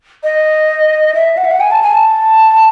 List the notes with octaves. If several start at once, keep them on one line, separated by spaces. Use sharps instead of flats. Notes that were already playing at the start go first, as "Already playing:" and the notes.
D#5
E5
F#5
E5
F#5
G#5
A5
G#5
A5